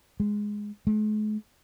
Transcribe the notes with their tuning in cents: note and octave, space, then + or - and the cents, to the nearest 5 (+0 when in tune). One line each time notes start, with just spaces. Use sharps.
G#3 +0
G#3 +45